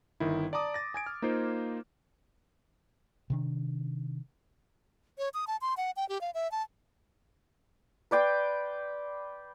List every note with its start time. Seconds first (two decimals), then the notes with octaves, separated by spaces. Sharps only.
0.20 G1 D#3 E4
0.53 D5 A5 A#5 D6 D#6
0.74 A6 A#6
0.94 G#5 G#6 D7
1.06 F6
1.22 A#3 D#4 F4 C5
3.30 C3 D#3 D4
5.18 C#5
5.34 D#6
5.47 A5
5.61 C6
5.77 F#5
5.97 G5
6.09 G4
6.21 F5
6.34 E5
6.52 A5
8.11 B4 D5 G5 C6